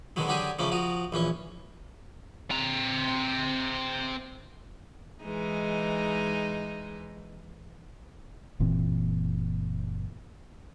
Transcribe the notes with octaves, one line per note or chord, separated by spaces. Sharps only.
B2 D3 D#3 F#3 G#3
D3 F#3 G4 G#4 C#6 D#6
C#3 F3 A3 C#4 D4
F3 F#4 A#5 D#6
A#1 E3 C#4 C#6
C4 A#5
E3 G#3 D#4
F#1 A#2 E3 C4